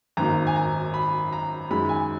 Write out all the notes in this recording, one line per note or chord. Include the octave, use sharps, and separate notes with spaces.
G#1 F#2 D#3 A#3 A#5
G#5
A#5
B5
A#5
F#2 D#3 G#3 B5
G#5